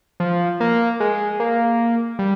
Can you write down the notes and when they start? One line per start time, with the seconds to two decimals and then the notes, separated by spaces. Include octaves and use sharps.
0.20 F3
0.60 A#3
1.00 G#3
1.40 A#3
2.19 G3